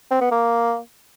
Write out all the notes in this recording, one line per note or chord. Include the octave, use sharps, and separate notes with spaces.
C4
B3
A#3